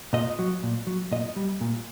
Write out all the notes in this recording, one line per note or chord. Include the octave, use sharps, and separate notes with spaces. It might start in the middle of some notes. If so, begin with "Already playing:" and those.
A#2 D#5
F#3
A#2
F#3
A#2 D#5
G3
A#2